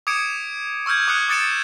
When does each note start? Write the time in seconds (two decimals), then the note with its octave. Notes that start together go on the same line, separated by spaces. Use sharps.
0.07 D6 D#6 G#6 C#7 D7 E7
0.86 C#6 E6 F6 G6 G#6
1.07 D6 D#6 F#6 G#6 C#7
1.28 D6 D#6 A6 C#7 D7 E7